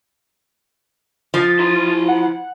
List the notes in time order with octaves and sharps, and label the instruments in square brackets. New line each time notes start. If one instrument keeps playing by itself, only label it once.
[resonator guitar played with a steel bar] F3 [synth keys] D#6 A6
[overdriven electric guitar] E4 C6
[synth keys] F#5